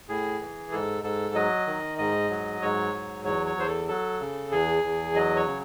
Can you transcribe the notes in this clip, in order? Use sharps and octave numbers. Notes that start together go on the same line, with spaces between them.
A2 G#4
E3
G#2 A4
G#2 A4
F#3 D#5
D#3
G#2 D#5
F#3
G#2 C#5
F#3
E2 C#5
C#5
E2 C5
A4
F#3 A4
C#3
E2 G#4
E2
F#3 D#5
C#5
C#3